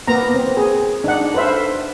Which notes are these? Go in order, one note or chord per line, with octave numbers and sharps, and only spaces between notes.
A#3 B3 A#5
C4
G#4
D4 D#4 F#5
A4 B4 C5 E5 F5